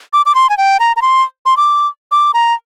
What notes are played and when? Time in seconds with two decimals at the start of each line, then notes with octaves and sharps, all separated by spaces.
0.13 D6
0.26 D6
0.35 C6
0.50 G#5
0.58 G5
0.80 A#5
0.96 A#5
1.02 C6
1.46 C6
1.57 D6
2.12 D6
2.34 A#5